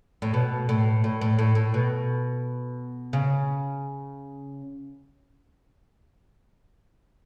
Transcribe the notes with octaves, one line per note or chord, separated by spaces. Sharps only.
A2
B2
A2
A2
A2
A2
A2
B2
C#3